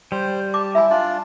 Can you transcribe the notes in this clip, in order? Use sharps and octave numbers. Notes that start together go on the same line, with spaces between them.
G3 C5
A5 D6
E4 E5 G#5
D4 F4 D5